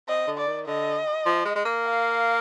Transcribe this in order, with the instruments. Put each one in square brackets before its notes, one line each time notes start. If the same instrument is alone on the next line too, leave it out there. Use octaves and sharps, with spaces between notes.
[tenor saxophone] C4 [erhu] D#5
[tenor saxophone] D3
[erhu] D5
[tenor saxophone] D#3
[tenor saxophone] D3 [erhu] D#5
[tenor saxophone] F3
G#3
G#3
A#3
[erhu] F5